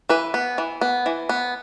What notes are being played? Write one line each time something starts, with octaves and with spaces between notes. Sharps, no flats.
E3 B4
B3
E3
B3
E3
B3